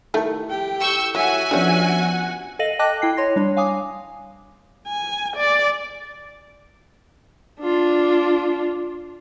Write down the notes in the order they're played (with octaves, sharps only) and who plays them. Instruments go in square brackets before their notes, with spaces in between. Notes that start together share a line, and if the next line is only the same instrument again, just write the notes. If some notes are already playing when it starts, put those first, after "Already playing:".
[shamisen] D#3 G3 A3 [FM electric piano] E4 A4
[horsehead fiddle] G4 G5
[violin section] C#6 E6 G6
[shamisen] F#3 [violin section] F#4 G#5 [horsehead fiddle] E5 F#5
[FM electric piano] F3 B3 D4 [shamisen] G3 C#4
[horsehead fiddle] F#5
[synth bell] A4 D#5 F5 A#6 D#7 F#7
D#5 G5 A5 D6 F#6 A#6
E4 G5 C7
C#5 C6 A#6
G3 D4 C#5
F5 G#5 D6 D#6
[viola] G#5
D5
D4 F4